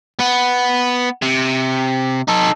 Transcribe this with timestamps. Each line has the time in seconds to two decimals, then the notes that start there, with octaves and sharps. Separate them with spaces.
0.19 B3
1.22 C3
2.28 D#4 A4